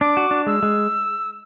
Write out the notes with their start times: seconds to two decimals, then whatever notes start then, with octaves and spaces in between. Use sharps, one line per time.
0.01 D4 D6
0.17 F#4
0.31 D4
0.47 G#3 E6
0.63 G#3